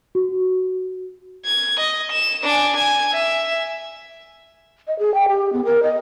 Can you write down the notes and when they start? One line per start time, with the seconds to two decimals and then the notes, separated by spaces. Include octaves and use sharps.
0.15 F#4
1.46 G#6
1.80 D#5
2.12 E7
2.44 D4 G#5
2.76 G#5 G#6
3.13 E5
4.87 D#5
4.99 G#4
5.14 G5
5.29 G4
5.53 B3
5.65 A#4
5.83 D#5